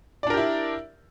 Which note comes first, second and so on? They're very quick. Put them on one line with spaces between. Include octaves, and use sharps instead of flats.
D5 D4 A#4 G4 E4